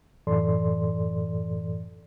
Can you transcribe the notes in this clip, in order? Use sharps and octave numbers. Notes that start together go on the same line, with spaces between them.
F#2 A2 E3 A4 D5 C6